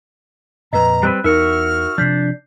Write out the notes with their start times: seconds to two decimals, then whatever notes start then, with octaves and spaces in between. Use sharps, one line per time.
0.73 F2 A#2 B4 D#5 A#5
1.03 G3 C4 B4 F#6
1.24 E2 D#4 F#4 A#4 E5 F6 C#7
1.98 C3 F3 D4 G6 B6 C7